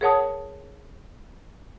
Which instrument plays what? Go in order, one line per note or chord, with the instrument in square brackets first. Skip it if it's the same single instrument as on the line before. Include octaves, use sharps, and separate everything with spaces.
[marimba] G#4 A#4 C#5 F#5 A5 D#6